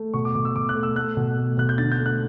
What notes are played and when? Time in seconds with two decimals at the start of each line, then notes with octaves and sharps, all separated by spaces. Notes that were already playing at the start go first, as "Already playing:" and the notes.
Already playing: A3
0.14 B2 C#6
0.25 D6
0.35 B2 D6
0.45 E6
0.56 B2 D6
0.69 F#6
0.75 A3
0.83 E6
0.96 A3 F#6
1.17 B2
1.38 A3
1.57 B2 F#6
1.69 G6
1.78 D3 A6
1.92 G6
1.99 A3
2.06 F#6